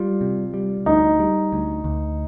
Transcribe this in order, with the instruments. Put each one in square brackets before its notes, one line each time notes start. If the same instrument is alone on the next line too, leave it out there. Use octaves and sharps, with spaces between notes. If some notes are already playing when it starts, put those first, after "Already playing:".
Already playing: [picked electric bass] G3 [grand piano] F4
[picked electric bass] C3
G3
[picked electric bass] D2 [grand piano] D#4
[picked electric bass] G3
D2
D2